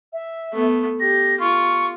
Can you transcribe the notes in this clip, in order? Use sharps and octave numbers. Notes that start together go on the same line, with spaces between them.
E5
A3 B3
G4 A#6
F4 C#6